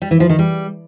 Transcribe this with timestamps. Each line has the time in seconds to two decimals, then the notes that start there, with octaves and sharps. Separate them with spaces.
0.02 G3
0.11 E3
0.20 F3
0.29 D#3
0.39 G3